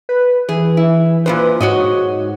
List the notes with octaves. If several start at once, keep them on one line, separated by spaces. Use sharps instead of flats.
B4
E3 G#4
E4
A#2 D#3 B4 C5
G#2 F#4 C#5 D#5